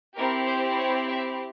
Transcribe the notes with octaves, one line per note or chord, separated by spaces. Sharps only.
C4 E4 G4 A#4
C5
C#5
E5